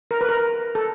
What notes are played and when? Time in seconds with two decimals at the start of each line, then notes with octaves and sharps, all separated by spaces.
0.11 A#4
0.21 B4
0.29 A#4
0.75 A4